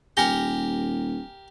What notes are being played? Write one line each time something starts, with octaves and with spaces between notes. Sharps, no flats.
D#1 G4 A#4 G#5 A#6 G7